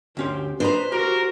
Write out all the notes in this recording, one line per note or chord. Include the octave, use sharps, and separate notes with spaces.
D2 C#4 G4 C5
D4 B4 C5 D#5 A#5
F#4 G4 A#4